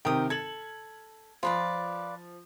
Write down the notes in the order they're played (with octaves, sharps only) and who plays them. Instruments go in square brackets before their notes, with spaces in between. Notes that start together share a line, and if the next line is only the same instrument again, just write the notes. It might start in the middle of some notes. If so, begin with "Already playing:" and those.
[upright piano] C3 D#3 A#4 [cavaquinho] G5 D#6
[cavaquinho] A4 [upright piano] G#6 F#7
[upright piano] F3 [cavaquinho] F4 B4 D5